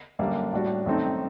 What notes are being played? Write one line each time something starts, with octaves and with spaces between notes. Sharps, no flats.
F#2 D3 G3 A#3 D4
A2 G3 D4 F#4
F#2 D#3 A3 C4 D#4